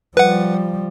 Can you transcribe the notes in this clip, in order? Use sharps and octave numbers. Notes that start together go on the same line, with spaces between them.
F3 G3 B4 F#5